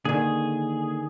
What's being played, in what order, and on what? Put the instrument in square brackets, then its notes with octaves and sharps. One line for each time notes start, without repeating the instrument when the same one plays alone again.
[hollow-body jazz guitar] D3 D#3 [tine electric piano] A#3 [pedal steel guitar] G#4